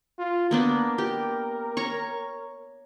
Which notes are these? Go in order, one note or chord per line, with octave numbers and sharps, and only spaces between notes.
F4
A#3 B3 D4 A#4
G4
C#5 A#5 C#6